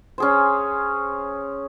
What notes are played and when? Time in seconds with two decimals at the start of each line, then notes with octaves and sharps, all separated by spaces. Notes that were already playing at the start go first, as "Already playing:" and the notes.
0.18 C#4 G#4 C5